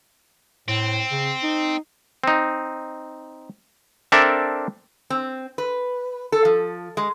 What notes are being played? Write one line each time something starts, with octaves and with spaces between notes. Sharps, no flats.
A2 C4
C#3
D#4
C4 D#4
C4 D4 A4 A#4 D5 E5
C4
B4
A4
F3
G#3